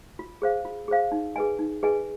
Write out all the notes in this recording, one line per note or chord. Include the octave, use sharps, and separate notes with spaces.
F4
G#4 C5 F5
F4
G#4 C5 F5
D#4
G#4 B4 D#5 G#5
D#4
G#4 B4 D#5 G#5